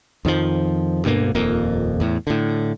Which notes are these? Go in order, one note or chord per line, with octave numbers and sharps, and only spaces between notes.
F2 D#3 F3
D2 G2 B2 A#3
D#1 F2 A#3
E2 A2
A2 D3